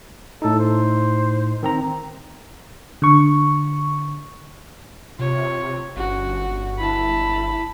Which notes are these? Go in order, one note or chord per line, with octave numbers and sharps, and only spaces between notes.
A2 D#4 A4
C5
D#3 C4 A#5
D3 C#6
C3 F4 C#5
G1 C#4 F#4
E4 A5 B5